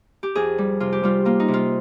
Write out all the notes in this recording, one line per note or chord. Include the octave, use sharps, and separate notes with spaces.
G4
F2 G#4
G3
C3 F4
G4
G3 F4
A#3 F4
D#4
C3
F4